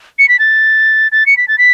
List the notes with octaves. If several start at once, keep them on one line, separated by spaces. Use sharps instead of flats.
C#7
B6
A6
A6
C#7
B6
A6
B6